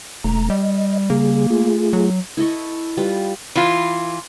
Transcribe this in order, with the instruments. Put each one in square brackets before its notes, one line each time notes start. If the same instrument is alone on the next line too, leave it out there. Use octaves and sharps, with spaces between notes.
[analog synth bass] E1 [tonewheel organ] A3 A#5
[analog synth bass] G3 [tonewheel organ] D#5
[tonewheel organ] C#3 G3 G#4 [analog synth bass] A#3
[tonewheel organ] A3 F4 G#4
[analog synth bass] F#3
[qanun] E4 A4 D#5 C#6
G3 F4 B4
[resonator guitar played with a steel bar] E3 F4